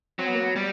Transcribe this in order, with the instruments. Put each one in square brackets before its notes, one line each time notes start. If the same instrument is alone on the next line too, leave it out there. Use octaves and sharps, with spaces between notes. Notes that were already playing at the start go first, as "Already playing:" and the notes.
[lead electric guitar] F#3 [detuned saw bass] C4
[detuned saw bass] B3
A#3
B3
[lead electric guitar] G3